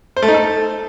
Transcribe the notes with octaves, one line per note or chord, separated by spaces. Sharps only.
C5
A3
D#4
A4